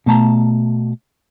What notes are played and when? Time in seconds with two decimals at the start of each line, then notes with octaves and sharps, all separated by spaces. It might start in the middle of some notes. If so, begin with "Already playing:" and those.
0.06 B2 A3 A5 A#5